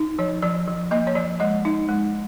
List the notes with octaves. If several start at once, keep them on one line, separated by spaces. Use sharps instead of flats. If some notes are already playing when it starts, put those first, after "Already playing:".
Already playing: D#4
F3 C#5
F3 D5
F3
A#3 D#5
C#5
F3 D5
G#3 D#5
D#4
G#3